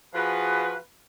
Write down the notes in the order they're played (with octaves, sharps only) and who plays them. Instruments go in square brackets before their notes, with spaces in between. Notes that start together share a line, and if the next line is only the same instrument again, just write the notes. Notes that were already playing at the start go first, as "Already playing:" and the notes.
[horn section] F3 F#4 G#4 B4